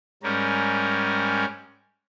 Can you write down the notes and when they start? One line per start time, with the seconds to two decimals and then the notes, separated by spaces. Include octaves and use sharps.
0.23 G#2 G3 C#4 A#4